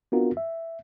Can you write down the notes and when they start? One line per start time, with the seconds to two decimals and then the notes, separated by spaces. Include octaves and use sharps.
0.12 B3 C4 D4 F4 F#4 A#4
0.37 E5